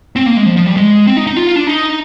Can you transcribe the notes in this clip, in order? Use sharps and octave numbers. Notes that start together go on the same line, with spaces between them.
C4
A#3
G#3
F3
F3
G3
G#3
C4
D#4
D#4
F4
D4
D#4